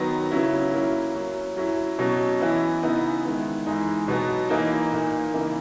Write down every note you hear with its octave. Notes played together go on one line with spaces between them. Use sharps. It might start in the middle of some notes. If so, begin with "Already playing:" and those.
Already playing: D#3 F#3 B3
C#3 F#3 C#4 E4
F#3 A#3 E4
F#3 C#4 E4
F#3 C#4 E4
B2 F#3 C#4
E3 B3 E4
C#3 E3 B3 D#4
D#3 G#3 B3 E4
E3 G#3 D#4
B2 F#3 B3
E3 A#3 D#4
A#2 A#3 D#4
C#3 E3 A#3 D#4